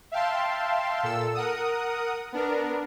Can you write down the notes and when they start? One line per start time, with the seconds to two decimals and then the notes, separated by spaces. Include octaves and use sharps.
0.12 E5 F5 G5 A5 C6
1.03 A#2 A4 E6
1.35 A#4 F#5 D#6
2.33 B3 D4 A#4